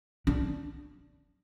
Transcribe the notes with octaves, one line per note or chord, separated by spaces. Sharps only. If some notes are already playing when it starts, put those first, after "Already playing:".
D4